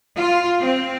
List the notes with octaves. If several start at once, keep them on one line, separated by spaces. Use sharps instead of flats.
F4
C4